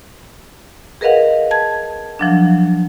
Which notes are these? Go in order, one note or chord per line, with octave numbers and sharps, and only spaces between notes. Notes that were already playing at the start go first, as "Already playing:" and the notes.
G#4 A#4 B4 D#5 F5 F#5
A5 G#6
F3 F#3 D4